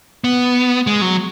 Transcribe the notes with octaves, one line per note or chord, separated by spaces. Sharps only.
B3
G#3
F#3